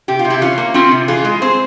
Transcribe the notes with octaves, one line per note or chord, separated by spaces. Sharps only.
C3 G4
F4
C3
E4 G4
E3 C#4 F4
A#3
C4 C#4 F4
C3
E3 F4 G#4
G#3
C4 G#4 C5